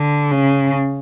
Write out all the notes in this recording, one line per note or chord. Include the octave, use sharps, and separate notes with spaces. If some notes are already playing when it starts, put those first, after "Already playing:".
Already playing: D3
C#3